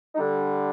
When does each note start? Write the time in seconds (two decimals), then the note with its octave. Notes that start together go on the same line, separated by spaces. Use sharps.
0.15 D#4
0.19 D3 G3 D4